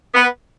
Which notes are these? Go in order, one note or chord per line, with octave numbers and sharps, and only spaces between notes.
B3